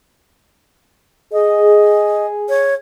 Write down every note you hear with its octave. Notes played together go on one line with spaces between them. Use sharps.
G#4 D#5
C#5